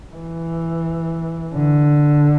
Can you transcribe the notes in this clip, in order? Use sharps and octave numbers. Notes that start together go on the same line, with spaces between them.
E3
D3